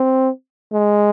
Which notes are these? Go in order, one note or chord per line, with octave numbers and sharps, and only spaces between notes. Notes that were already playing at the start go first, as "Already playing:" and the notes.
Already playing: C4
G#3